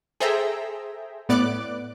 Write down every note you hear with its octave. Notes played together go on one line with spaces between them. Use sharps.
G#4 A4 C5 E5 G5 A#5
A2 B3 D5 D6 F#6